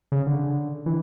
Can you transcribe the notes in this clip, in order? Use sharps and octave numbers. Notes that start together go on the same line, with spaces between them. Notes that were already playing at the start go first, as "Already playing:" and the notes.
C#3
D3
E3